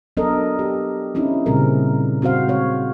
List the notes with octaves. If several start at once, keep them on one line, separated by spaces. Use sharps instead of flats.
F#3 B3 D4 A4 A#4 D#5
G4
C4 C#4 D#4 E4
A#2 C#3 G3 C4 G#4 A#4
C4 F#4 C5 F5
G#3 C#5